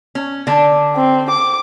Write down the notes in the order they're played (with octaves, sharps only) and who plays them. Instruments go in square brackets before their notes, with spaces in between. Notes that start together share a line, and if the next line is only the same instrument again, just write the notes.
[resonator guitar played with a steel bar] C#4
D3 D4
[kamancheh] C4
D6